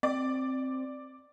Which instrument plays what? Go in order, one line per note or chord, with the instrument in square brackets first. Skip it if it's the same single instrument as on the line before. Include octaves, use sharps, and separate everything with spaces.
[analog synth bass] C4 [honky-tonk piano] D5